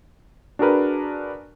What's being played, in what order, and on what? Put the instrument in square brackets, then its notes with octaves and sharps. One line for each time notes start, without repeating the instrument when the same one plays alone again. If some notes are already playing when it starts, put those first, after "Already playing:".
[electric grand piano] D4 F#4 G#4 A#4 B4